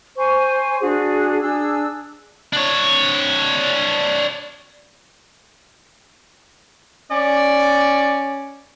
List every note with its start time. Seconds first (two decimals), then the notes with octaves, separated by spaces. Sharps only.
0.17 C5 G#5 C#6
0.80 D4 F#4 G#4
1.41 D4 G#4 E6
2.53 D4 C#5
7.11 C#4 D5